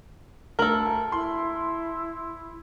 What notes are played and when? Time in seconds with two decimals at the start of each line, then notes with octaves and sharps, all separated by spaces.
0.59 D2 A4 A#4 F#7
1.12 E4 C6